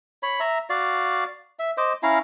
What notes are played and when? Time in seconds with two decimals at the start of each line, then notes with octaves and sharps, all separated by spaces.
0.23 C#5 B5
0.40 E5 A#5
0.70 F#4 D5 F5
1.59 E5
1.77 C5 D#5 D6
2.03 C#4 E4 F5 A#5